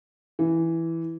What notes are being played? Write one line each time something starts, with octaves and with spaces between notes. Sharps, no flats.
E3